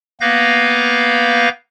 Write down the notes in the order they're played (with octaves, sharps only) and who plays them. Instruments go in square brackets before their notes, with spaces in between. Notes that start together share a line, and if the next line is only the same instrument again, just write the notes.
[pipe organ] A#3 B3 B4 F5 G6 A#6